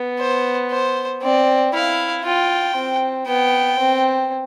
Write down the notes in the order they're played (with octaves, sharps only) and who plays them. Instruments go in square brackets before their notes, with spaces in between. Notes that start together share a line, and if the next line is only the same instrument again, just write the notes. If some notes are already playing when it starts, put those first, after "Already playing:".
Already playing: [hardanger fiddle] B3
[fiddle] C5
C5
[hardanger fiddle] C4 [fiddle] D5
[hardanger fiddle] E4 [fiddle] F5
[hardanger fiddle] F4 [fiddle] G5
[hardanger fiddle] C4
[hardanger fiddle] B3 [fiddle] G5
[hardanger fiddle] C4